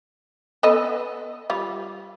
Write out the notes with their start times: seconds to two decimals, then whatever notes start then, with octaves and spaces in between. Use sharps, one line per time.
0.63 B3 A4 D#5
1.50 G3 F4